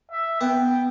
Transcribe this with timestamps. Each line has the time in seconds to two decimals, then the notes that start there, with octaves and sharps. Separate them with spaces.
0.11 E5
0.41 B3 G5